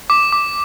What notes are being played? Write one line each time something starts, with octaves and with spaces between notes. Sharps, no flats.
D6
D6